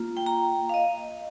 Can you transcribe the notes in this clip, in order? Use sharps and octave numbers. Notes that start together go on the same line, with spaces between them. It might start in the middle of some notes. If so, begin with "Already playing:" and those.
Already playing: A#3 F4
G5
A#5
F5
D#5